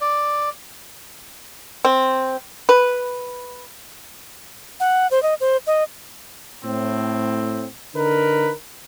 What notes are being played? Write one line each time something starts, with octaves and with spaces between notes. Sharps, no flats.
D5
C4
B4
F#5
C5
D#5
C5
D#5
A2 C4
D3 D#4 A#4 B4